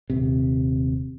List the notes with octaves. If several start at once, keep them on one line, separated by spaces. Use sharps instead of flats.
D#1 C3